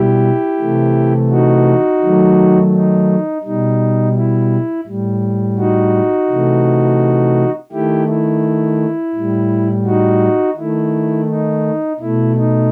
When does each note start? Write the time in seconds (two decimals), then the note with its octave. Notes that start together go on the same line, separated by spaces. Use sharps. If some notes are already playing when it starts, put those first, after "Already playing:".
Already playing: B2 G3 E4 G4
0.59 C3 E3 A3
1.30 D#4 F#4
2.01 D#3 F#3 A3
2.73 D#4
3.44 B2 G3 D#4
4.16 E4
4.87 A2 G3
5.58 D#4 F#4
6.30 C3 E3 A3
7.72 D#3 A3 E4 G4
8.08 E4
9.15 A2 G3
9.85 D#4 F#4
10.57 D#3 A3 E4
11.28 D#4
12.00 B2 A3 E4
12.36 D#4